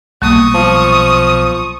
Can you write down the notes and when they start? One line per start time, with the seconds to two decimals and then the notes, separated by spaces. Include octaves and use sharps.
0.22 B1 A#2 G3 A#3 C#6 D#6
0.54 F3 A5